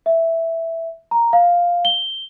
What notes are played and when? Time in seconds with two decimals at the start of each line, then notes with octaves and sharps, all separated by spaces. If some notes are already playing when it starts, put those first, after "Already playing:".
0.06 E5
1.11 A#5
1.33 F5
1.85 G7